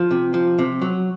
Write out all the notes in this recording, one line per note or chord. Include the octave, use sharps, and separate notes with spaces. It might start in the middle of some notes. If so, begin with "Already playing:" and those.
Already playing: F3
C3
F3
C3
F#3